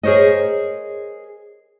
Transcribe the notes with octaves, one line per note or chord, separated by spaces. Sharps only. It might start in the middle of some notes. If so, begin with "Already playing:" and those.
G#4 A#4 C5 C#5 D#5